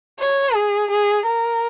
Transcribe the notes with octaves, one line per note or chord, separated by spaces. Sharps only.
C#5
G#4
G#4
A#4